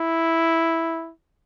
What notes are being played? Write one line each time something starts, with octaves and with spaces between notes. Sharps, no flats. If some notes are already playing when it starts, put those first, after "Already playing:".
Already playing: E4